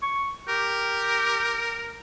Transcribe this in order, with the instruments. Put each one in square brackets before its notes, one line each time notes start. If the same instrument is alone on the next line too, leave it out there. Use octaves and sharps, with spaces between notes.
[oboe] C#6
[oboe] G4 [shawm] A#4